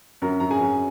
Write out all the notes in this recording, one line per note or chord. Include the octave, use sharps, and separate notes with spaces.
F#2 A#4 A#5
F#2 A#5
G#4 G#5
F#2